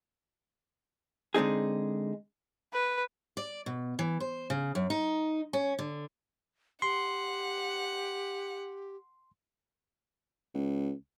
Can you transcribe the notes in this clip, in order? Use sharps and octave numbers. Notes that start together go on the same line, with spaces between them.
D3 G#3 C4 D#4 G#4
B4
D5
B2
E3
C5
C#3
F#2
D#4
C#4
D3
G4 F#5 C6
C#2